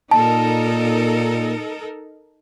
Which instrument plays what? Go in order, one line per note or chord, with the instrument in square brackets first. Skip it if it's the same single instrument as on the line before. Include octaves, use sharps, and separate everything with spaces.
[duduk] A#2 [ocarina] A#3 [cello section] D#4 A4 A#4 [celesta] A5